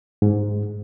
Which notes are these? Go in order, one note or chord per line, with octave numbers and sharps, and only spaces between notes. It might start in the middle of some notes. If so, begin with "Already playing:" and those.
G#2